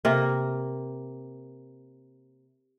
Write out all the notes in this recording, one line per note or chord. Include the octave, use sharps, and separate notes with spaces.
C3 A#3